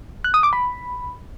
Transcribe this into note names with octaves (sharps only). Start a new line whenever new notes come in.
F#6
D#6
D6
B5